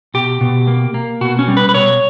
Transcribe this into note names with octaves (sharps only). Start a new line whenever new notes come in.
B2 G4
B2
A#3
A#3
B2 F#4
C#4
G3
B4
B4
B2 C#5